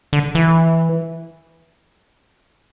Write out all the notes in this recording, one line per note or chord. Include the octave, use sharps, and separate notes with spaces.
D3
E3